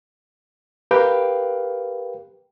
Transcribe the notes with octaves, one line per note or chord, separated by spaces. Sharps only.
G4 A#4 B4 F5 G5